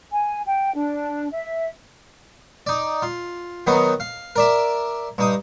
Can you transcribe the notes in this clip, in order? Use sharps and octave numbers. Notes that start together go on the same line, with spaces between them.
G#5
G5
D4
E5
D#4 D5
F4
D#3 F#3 B3 D#4
F5
A#4 D5 E5
G2 D#4 D#6